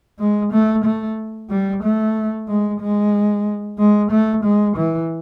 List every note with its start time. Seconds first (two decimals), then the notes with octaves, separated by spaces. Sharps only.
0.19 G#3
0.52 A3
0.84 A3
1.50 G3
1.83 A3
2.48 G#3
2.80 G#3
3.78 G#3
4.11 A3
4.44 G#3
4.76 E3